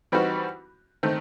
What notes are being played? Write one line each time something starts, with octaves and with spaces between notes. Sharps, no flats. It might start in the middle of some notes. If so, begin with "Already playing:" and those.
E3 G3 C4 D#4 F#4
D#3 A3 C4